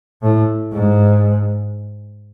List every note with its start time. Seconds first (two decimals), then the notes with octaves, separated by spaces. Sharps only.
0.23 A2
0.73 G#2